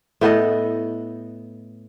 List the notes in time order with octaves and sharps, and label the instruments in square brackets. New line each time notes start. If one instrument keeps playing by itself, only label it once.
[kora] A2 B3 A4 D#5